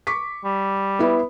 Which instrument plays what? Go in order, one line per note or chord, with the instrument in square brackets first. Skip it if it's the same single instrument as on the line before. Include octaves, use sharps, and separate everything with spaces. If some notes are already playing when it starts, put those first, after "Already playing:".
[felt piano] C#6 D6 B6
[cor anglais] G3
[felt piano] B3 E4 B4